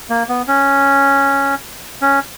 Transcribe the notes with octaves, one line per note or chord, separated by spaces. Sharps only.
A#3
B3
C#4
C#4